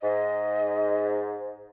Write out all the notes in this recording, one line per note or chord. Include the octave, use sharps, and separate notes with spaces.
G#2 D#5